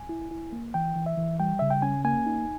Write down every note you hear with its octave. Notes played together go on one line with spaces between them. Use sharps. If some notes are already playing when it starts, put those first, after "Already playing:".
Already playing: G#5
E4
E4
A#3
E3 G5
E3
E5
E3
G3 G5
C#3 E5
G5
C#4 G#5
A#3 G#5
D#4